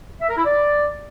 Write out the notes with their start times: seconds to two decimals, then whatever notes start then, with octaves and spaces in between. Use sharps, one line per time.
0.21 E5
0.29 A#4
0.37 E4
0.45 D5